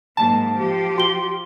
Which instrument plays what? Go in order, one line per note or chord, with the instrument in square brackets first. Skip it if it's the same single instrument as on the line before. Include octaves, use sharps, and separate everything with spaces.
[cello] G#2 A#3 [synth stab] A5
[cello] F3 G4
[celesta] F#4 C6 G7